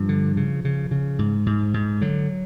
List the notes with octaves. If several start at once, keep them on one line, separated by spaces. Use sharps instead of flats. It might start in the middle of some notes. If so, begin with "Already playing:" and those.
Already playing: G2 F3
D3
C#3
C#3
C#3
G#2
G#2
G#2
D3 F#3